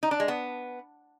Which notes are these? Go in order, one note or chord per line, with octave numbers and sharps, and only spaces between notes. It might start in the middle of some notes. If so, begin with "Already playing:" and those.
D#4
D4
G#3
B3